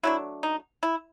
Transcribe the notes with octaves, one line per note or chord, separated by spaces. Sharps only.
F#3 A3 D4 E4
D#4
E4